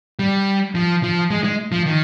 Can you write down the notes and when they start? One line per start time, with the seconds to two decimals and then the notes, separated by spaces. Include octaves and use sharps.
0.19 G3
0.75 F3
1.03 F3
1.30 G#3
1.44 G#3
1.72 F3
1.86 D#3